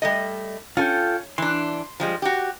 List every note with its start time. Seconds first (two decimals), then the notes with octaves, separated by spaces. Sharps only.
0.02 G3 A3 D#5
0.77 C#4 F4 A4 G5
1.38 E3 D4 C6
2.00 F3 G3 G#3
2.22 F#4 G4